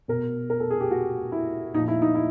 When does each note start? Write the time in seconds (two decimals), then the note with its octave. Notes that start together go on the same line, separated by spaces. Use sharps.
0.08 B2 A#4
0.50 A#4
0.60 A4
0.70 G#4
0.81 G4
0.91 F#4
1.32 E4
1.73 A#2 D#4
1.77 F3
1.88 E4
2.02 D#4
2.15 E4